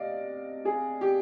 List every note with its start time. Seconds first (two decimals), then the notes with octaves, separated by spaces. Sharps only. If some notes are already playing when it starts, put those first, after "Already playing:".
Already playing: C3 D5 D#5 F5
0.65 G#4
1.01 G4